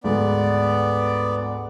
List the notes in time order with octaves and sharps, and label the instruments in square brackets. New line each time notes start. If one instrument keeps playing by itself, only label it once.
[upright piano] D2 G#2 [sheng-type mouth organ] B3 D5